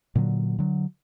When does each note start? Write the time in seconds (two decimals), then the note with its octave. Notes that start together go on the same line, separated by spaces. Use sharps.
0.15 A#2 D3 F3 F#3
0.59 D3 F#3